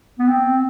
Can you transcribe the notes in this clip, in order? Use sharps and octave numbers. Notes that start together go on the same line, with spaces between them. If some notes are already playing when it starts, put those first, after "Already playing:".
B3
C4